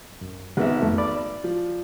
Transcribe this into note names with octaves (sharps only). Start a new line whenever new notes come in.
F#2
G#1 B3 E5 F#5
F2 A3
D5 B5 D6
D5
F3